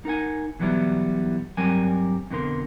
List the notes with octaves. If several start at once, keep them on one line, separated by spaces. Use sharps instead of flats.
D#4 A#4 F#5 G#5
B2 E3 F#3 G3 B3 E4
G2 F#3 G3 C4 A#4 G#5
F2 B2 D3 F3 A#4 C6